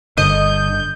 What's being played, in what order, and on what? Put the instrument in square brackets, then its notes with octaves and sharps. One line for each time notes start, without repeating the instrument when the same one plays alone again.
[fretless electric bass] G1 [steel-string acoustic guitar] D3 [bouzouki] D#5 [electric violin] G6